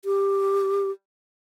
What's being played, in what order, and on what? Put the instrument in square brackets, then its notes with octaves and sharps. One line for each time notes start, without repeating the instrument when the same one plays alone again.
[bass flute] G4